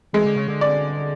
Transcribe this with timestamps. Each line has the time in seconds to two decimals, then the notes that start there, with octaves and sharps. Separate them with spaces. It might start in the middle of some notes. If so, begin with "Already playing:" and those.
0.13 E3 G#3
0.25 D3
0.36 C#3
0.48 D3
0.61 D5